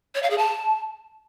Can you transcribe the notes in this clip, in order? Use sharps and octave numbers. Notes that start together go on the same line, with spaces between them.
C#5
F5
G#4
A5